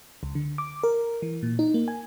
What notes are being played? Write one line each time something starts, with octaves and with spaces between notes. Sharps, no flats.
C#2
D3
D6
A#4
E3
A#2
D#4
A#3
G#5